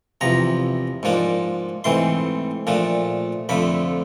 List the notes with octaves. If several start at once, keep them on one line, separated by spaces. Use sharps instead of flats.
E2 C3 F3 A#5
G#2 F3 A#3 D4
G#2 E3 A3 C4 C6
A#2 F3 A3 D4
F2 D3 F3 A3 B5